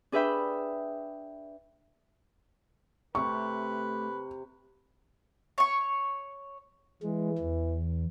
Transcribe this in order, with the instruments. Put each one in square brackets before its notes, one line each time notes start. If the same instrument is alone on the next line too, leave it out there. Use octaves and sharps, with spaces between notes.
[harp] D4 G#4 B4 E5 G5 B5
[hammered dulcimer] C3 [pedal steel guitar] A3 G4 [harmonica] B4 [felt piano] C#6
[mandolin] C#5 C#6
[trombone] E3 [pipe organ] G#3
[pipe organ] E2